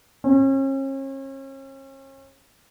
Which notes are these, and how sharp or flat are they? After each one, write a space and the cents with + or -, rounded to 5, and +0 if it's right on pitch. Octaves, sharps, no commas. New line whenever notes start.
C#4 -40